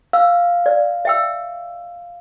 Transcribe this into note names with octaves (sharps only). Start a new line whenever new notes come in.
F5 E6
D5
E5 G5 E6